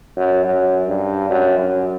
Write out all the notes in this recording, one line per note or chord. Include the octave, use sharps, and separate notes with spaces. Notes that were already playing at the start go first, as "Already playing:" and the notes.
F#2
F#2
G2
F#2
F#2